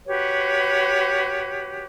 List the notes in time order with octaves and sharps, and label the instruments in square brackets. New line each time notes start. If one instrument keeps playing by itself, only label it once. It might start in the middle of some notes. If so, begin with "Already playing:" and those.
[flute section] F#4 G4 B4 C#5